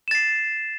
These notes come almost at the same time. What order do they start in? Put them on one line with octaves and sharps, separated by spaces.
E7 A6 C7